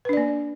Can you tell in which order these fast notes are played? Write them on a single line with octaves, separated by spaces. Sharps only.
B4 D4 D5 A#3